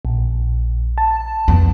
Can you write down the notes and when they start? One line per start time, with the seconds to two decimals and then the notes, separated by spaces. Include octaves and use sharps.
0.05 A#1
0.98 A5
1.48 F2 B3